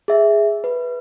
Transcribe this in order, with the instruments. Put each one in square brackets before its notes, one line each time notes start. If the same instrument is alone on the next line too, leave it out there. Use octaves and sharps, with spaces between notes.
[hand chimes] G#4 E5
B4